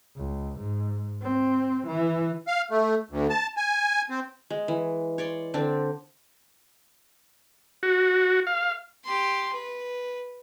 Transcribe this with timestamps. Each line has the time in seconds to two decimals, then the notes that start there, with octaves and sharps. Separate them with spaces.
0.16 C#2
0.59 G#2
1.22 C4
1.87 E3
2.47 F5
2.71 A3
3.11 D2
3.29 A5
3.57 G#5
4.10 C4
4.50 G#3
4.68 E3
5.18 C#5 D5 C6
5.54 D3 C4 D4
7.83 F#4
8.47 F5
9.05 G4 C6
9.53 B4